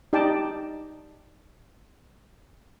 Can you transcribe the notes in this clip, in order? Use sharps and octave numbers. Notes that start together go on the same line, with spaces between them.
D#4 G4 D5 G5 A5